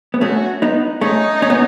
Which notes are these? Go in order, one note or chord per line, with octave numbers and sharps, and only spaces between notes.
B3
A3 C#4 F#4
B3 D#4
A3 C#4 D#4
C#4
B3